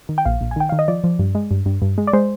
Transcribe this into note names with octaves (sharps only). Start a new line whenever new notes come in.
D#3
G5
A#1 F5
A#1
G#5
D#3 G5
D#3 F5
D#5
F3 D5
F3
G2
G#3
G2
G2
G2
G#3
D5
G#3 C5